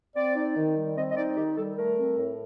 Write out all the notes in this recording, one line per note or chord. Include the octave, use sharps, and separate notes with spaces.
C4 D5
D#4
D#3
G3
C4 D#5
D#5
D#4 D5
D#3 G4
G3 A4
A3 A#4
C4
A2